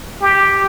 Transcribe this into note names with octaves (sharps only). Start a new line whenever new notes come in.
G4